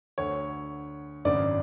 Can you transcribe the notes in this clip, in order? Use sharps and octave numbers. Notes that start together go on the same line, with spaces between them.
D2 D3 C#5
G#1 F#2 C#3 D5